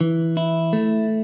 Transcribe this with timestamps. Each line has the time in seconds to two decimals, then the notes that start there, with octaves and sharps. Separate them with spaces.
0.01 E3
0.37 E4
0.73 A3